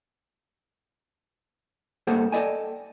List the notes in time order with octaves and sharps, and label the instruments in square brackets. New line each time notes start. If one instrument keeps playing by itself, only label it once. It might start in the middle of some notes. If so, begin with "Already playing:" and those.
[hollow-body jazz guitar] G2 A#3 G#4 A4 C5 F#5
A4 B4 D5 D#5 G5 G#5